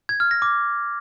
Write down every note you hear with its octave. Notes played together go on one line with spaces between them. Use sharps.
G#6
F6
A#6
D6